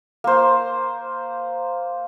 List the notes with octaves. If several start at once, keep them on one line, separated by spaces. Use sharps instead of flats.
A#3 C5